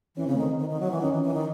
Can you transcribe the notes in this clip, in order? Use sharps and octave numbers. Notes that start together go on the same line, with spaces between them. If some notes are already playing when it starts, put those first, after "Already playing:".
E3 C#4
C#3 C4
A3
D#3 C4
D#3
D#3
F#3
E3
D#3 C#4
E3
E3
D#3